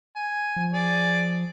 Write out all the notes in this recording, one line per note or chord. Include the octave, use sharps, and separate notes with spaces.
G#5
F3
G#4 D5